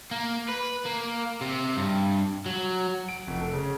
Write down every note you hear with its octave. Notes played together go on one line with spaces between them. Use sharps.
A#3
B4
A#3
C3
G2
F#3
D7
F1
A4
C#3